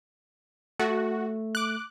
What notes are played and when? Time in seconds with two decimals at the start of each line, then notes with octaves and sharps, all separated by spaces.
0.79 A3 F#4
1.55 D6 F#6